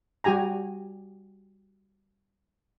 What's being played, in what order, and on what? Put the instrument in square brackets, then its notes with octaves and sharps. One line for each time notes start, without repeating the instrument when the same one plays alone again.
[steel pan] G3 F#4 G4 G#5 A#5